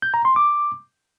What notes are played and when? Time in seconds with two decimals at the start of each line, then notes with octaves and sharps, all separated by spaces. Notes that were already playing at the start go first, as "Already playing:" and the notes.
0.02 G6
0.14 A#5
0.25 C6
0.36 D6